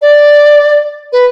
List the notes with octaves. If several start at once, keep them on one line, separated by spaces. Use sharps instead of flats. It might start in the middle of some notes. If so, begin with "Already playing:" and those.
D5
B4